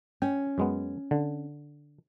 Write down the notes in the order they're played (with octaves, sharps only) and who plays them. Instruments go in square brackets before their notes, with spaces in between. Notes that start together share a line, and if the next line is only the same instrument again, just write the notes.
[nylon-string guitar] C#4 [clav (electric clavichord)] G5
[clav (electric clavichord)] F#2 G#3 B3
D3